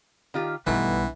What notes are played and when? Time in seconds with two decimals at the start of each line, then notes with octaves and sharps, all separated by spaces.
0.34 D#3 F4 G4
0.67 B1 G2 D#3 E3 A3 B3